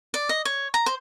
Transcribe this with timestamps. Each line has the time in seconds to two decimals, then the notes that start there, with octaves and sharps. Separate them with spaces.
0.14 D5
0.29 D#5
0.45 C#5
0.74 A#5
0.86 C5